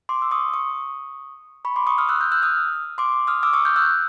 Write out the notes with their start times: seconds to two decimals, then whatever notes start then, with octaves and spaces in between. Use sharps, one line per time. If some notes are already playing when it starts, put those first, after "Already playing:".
0.09 C6 D6
0.22 E6
0.31 C#6 D#6
0.54 C#6 D#6
1.65 B5 C#6
1.76 C6 D6
1.87 C#6 D#6
1.98 D#6 F6
2.09 E6 F#6
2.21 F6 G6
2.32 E6 F#6
2.42 D#6 F6
2.98 C6 D6
3.27 D#6 F6
3.43 D6 E6
3.53 C#6 D#6
3.65 F6 G6
3.76 E6 F#6